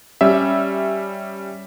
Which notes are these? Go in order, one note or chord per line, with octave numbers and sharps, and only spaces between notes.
G3 C#4 E5